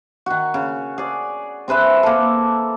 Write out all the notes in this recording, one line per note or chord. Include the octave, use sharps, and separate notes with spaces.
D#3 F#4
C#3
G#4 D5
C4 G#4 B4 E5
A#3 A4